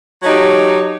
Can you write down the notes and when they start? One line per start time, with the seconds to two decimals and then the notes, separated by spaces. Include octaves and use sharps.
0.23 F#3 A3 D#4 G4 C#5